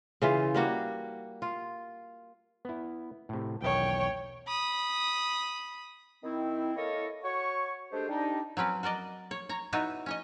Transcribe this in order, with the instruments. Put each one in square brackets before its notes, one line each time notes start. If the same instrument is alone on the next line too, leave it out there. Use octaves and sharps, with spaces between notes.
[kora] C#3 E3 F4
G3 A#3 F#4
F4
[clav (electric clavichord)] B3 E4
A2 C3
[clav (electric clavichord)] B1 E2 D#3 [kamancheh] C#5 G5
[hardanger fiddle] B5 D#6
[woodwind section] D#3 C4 E4
A#3 E4 A4 A#4 C#5 D#5
F#4 C#5 C#6
G#3 A3 D4 G4 G#4 C5
G3 D4 D#4
[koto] F#3 C4 C#4 B4
F#4 A#4 D5 D#5
C#5
C#5 A#5
B3 D#4 E4 F#4 B4 C#5
C#4 C#5 D#5